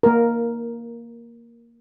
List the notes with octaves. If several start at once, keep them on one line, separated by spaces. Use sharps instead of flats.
A#3 A#4